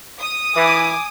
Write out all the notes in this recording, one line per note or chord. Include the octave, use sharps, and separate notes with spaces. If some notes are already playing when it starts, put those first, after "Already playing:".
D#6
E3 G#5 D6